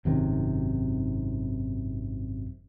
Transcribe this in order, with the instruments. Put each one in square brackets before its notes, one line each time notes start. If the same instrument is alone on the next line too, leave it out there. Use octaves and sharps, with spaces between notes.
[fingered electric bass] G#1 F#2 C3 D#3